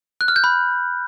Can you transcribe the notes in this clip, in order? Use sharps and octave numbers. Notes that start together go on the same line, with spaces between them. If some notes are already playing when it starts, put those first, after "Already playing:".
F#6
F6
G6
B5